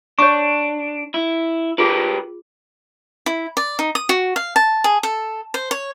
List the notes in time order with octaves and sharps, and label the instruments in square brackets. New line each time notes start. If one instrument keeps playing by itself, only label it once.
[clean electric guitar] D4 [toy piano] C#5 C#6
[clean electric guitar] E4
[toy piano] F4 G#4 [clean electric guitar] G4 A#4 B4
[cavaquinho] E4
D5
D#4
D#6
F#4
F5
A5
G#4
A4
C5
C#5